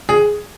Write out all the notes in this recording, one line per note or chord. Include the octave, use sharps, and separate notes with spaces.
G#4